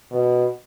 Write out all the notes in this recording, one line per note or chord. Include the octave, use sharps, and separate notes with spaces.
B2